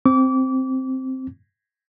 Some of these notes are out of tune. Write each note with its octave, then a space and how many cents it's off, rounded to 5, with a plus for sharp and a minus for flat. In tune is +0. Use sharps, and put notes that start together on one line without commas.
C4 +0 D6 -30